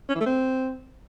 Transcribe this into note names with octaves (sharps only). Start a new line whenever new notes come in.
C#4
E3
A3
C4